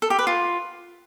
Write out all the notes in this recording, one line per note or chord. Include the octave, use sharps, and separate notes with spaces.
A4
G4
B4
F4